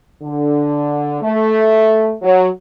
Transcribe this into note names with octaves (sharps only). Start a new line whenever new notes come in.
D3
A3
F#3